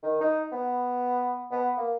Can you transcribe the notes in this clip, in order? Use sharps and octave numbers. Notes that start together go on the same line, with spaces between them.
D#3
D#4
B3
B3
A#3